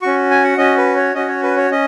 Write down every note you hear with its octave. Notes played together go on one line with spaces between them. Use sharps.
C#4 F#4 C#6
G#5
F#5
C#4 F#4 D#5
B4
C#5
C#4 F#4 D#5
C#5
B4
C#5
C#4 D#5